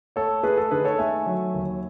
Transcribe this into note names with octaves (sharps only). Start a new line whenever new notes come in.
A3 A4 C#5
A3 G#4 B4
A4
D#3 G#4 B4
A4 C#5
A3 E5 G#5
F#3
D#2